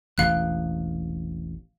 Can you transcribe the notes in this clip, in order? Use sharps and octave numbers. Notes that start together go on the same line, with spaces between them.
E1 A1 C3 F5 F#6